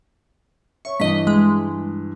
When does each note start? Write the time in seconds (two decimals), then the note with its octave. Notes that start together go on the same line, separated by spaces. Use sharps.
0.85 C#5 E5 C#6
1.00 G2 E3 D#5 B6
1.27 G#3